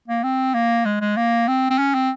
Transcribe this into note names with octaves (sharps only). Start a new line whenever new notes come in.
A#3
C4
A#3
G#3
G#3
A#3
C4
C4
C#4
C4